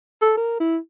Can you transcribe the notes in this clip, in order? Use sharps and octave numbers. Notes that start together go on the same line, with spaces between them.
A4
A#4
E4